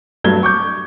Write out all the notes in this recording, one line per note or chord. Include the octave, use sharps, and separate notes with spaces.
G2 F#3 A3 G#6 G7
C#6 D6 G6